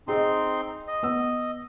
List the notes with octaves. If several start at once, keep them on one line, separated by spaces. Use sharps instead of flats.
C4 D#4 G#4 D#5 C6
D#5
B3 E6